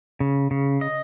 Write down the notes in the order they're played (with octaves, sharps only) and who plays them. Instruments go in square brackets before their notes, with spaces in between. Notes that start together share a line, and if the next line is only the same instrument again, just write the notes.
[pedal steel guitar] C#3
C#3
D#5